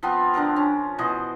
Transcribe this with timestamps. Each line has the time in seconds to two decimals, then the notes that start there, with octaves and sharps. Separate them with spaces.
0.03 F3 B3 C4 F4
0.34 D3 D4 A#4 A#5
0.56 C#4
0.98 B2 E3 C5 D#5